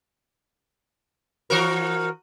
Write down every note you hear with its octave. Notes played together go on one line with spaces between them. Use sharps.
E3 F#4 A#4